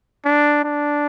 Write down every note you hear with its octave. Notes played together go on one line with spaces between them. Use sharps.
D4
D4